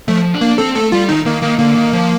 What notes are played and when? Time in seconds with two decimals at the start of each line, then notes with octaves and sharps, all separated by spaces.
0.08 F3 A3
0.34 D4
0.41 A#3
0.58 C4 A4
0.76 A3 A4
0.92 G3 F4
1.09 D#3 D#4
1.25 D#3 A#3
1.42 D#3 A#3
1.59 D3 A#3
1.75 D#3
1.93 F3